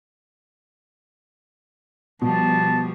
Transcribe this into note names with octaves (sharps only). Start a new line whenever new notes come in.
B2 F3 G3 A5